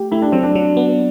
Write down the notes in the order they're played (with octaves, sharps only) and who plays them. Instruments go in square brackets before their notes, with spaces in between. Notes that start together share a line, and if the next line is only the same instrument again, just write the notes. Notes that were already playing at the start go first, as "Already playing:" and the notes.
Already playing: [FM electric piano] A3 G4
[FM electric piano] A3 [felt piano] E4
[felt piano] D4
[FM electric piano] F#3 [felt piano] C4
[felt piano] D4
[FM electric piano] F#3
B3